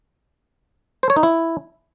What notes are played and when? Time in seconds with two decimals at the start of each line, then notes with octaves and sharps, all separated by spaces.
1.03 C5
1.10 C#5
1.16 D#4
1.23 E4